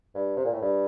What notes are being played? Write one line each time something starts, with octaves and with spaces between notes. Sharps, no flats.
G2
C3
A#2
A2
G2